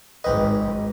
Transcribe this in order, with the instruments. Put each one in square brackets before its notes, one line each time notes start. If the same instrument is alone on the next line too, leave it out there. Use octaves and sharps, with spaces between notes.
[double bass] G#1 [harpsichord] C#2 C4 B4 [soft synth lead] D#5